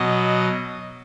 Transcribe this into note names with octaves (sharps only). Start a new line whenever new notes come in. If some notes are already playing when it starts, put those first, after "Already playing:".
Already playing: B2 F#3 D#5